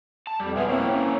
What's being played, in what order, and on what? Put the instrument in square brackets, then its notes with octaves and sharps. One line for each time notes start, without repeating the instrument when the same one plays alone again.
[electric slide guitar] A5
[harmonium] F2 [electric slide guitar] G3
[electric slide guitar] B2 F3 G#4 [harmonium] B3 E5 G#5
[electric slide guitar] A#3 E4 [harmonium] C4 C#5
[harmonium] C#4